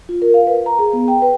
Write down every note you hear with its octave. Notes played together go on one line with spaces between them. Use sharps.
F4
A#4
F5
B4
A#5
G#4
B3
G5
B4